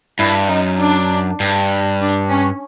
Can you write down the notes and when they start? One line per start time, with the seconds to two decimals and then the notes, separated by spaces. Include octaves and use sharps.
0.18 G2 E4
0.48 F#2 D#4
0.79 D4
1.40 G2
2.00 D4
2.30 C#4